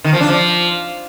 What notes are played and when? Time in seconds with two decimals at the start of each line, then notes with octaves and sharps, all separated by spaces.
0.04 D#3
0.13 F3
0.21 D4
0.29 F3